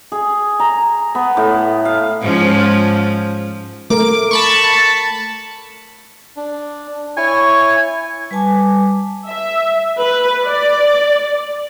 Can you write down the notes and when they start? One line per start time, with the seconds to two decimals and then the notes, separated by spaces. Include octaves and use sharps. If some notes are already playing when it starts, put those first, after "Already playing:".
0.12 G#4
0.60 A#5
1.15 B3
1.37 A2
1.85 F5
2.22 G#2 F3 C#4
3.90 A3 A#4 D6
4.31 A5 B5 C#6
6.37 D4
7.17 E4 C#5 G#5 C#6
8.31 G3 B4 G#5 A5 D6
9.27 E5
9.99 B4
10.46 D5